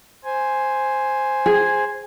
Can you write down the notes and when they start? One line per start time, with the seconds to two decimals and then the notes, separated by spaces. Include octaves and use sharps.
0.24 C5 G#5
1.46 G#4